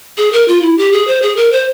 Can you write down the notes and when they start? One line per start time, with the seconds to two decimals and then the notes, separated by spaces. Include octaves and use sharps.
0.18 G#4
0.33 A#4
0.48 F4
0.62 E4
0.78 G4
0.92 G#4
1.07 C5
1.22 G#4
1.37 A#4
1.52 C5